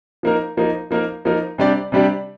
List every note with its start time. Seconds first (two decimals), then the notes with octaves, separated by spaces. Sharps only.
0.23 F3 A#3 D#4 A#4
0.57 F3 A#3 D#4 A#4
0.91 F3 A#3 D#4 A#4
1.25 F3 A#3 D#4 A#4
1.58 C3 G3 D4 G4 D5
1.92 C3 G3 D4 G4 D5